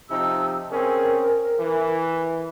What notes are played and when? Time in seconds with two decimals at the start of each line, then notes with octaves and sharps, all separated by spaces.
0.10 C3 F3 D#4 E6
0.71 C4 C#4 G#4 A#4
1.60 E3